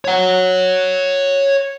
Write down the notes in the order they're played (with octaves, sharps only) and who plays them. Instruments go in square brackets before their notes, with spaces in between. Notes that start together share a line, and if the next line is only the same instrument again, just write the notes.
[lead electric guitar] C#5 F#5